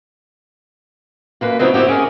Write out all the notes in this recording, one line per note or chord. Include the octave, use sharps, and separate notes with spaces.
F#2 A#3 B4
C#3 F#3 B3 C4 D#4 E4
C4 E4 F#4 G4
C#4 G#4 A#4